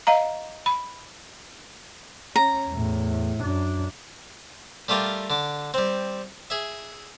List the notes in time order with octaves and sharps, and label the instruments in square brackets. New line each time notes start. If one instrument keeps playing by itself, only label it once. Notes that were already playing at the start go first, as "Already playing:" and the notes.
[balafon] D#5 F5 A#5
B5
[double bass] C#4 [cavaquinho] A#5
[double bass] E2 A2
F#2 D4
[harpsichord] G3 A3 F4 G4 A#4
D3 D6
G3 C4
G#4 E5